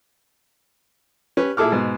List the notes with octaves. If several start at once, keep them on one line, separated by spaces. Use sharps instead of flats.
C#4 G4 B4
A#2 E4 G#4 A4 D6 F6
G#2 B2